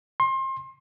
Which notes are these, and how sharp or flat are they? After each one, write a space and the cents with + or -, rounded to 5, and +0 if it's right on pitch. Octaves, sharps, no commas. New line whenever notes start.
C6 +30